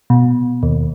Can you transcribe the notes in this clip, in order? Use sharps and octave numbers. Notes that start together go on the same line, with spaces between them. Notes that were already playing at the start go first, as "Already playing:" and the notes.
B2
D#2